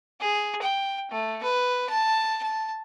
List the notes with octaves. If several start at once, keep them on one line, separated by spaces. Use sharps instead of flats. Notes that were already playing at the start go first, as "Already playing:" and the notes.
G#4
G5
A3
B4
A5
A5